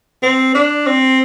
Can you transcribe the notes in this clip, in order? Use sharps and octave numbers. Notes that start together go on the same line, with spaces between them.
C4
D4
C4